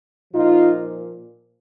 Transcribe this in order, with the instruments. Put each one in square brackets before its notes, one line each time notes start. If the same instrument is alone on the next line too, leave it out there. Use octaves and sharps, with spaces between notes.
[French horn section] A#2 F3 D#4 F4